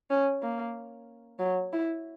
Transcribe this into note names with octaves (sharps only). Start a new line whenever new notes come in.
C#4
A#3
F#3
E4